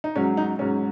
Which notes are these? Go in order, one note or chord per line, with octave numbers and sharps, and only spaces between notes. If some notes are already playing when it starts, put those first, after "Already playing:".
D#4
G#2 F#3 C#4
D#4
G#2 F#3 C#4